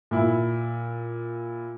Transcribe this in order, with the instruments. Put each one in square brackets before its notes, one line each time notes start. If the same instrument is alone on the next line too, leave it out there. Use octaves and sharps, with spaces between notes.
[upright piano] A#2 E4